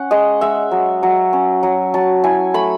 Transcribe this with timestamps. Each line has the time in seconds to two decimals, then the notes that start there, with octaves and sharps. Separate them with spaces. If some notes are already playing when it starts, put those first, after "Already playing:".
Already playing: C#4 F#5
0.11 G#3 D#5
0.41 G#3 E5
0.71 F#3
1.03 F#3
1.33 C#4
1.63 F#3
1.94 F#3 A5
2.24 E4 G#5
2.54 A3 B5